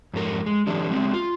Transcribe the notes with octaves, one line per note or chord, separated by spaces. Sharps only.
F2 G#2 F#4 A#4
G#3
D3 E3 F#3 G3 D4
G3 G#3 C4
F4